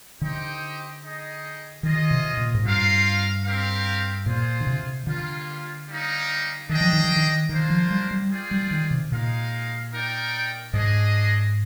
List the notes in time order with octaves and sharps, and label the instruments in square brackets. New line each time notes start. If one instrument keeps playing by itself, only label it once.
[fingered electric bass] D3 [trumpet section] D#4 G4 C5 D#5 G5
[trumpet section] D#4 G#4 D#5 G5
[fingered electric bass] D#3 [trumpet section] F4 G#4 D#5
[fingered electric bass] C3
A#2
G#2
[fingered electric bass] G2 [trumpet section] C4 F4 A#4 F5
[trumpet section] C4 G4 A#4 F5
[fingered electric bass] A#2 [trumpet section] F4 G#4 C5 F5
[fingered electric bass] D3
C3
[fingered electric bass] D3 [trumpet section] G3 A#3 F4
[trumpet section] G3 A#3 D#4
[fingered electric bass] D#3 [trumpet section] D4 G#4 D#5 G5
[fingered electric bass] F3
D#3
F3
D#3
[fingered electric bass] D#3 [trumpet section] A#3 D4 F4 C5
[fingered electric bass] F3
G3
G3
[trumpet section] F4 G#4 D5 G5
[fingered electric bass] G3
D#3
C3
[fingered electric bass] A#2 [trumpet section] G#3 D#4 A#4 F5
[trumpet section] D#4 A#4 D5 G5
[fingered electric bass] G#2 [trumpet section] D4 G#4 D#5